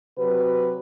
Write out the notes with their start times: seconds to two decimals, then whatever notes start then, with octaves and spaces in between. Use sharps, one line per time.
0.18 C3 F#3 F#4 B4